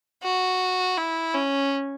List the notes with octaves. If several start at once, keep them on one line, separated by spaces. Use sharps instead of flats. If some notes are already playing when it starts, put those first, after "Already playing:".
F#4
E4
C#4